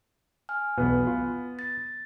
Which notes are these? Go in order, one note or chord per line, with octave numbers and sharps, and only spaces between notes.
G#5 F6
B1 E2 B2 B3
F4
A6